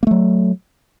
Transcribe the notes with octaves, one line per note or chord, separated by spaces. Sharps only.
F#3 A3 A#3